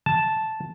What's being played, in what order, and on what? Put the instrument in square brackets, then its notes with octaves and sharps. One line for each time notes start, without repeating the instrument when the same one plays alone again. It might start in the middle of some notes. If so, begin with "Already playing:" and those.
[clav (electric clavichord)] A5